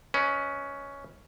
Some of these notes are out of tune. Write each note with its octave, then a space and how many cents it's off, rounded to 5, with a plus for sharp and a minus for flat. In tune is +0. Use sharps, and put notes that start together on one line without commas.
C#4 +10 B4 +0 D#5 +30